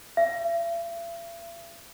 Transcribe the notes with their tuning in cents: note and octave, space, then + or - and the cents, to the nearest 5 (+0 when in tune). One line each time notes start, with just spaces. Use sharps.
E5 +45